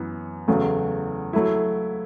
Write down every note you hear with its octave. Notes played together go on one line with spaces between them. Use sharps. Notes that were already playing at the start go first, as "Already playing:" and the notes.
Already playing: F#2 E3 B3
E2 C#3 F#3 A3
F#3 A3 E4